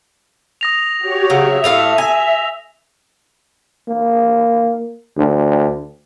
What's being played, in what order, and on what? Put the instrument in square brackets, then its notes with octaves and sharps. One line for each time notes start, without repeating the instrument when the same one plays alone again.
[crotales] D#6 A#6 F7
[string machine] F#4 G4 C#5
[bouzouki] C#3 F#3 C4 [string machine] E5
[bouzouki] A2 A3 F5 [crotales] F7
[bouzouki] G#5
[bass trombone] A#3
D2